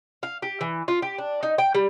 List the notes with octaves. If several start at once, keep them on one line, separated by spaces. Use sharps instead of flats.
F5
G4
E3
F4
G4
D4
D#4
G5
G3